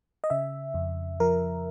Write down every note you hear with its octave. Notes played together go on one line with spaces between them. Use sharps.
D#5
C#3 E5
F2
F3 A#4